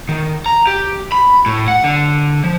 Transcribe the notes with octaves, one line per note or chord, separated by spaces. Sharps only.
D#3
A#5
G4
B5
A2
F#5
D3
F3